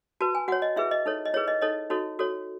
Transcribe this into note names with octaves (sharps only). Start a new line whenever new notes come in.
F#4 B4 A5
G#5
F#4 C#5 F#5
D#5
E4 G#4 B4 E5
D#5
D#4 A4 C#5
D#5
E4 G#4 B4 C#5
D#5
D#4 A4 C#5 D#5
D#4 F#4 A4 C#5
F#4 A4 C#5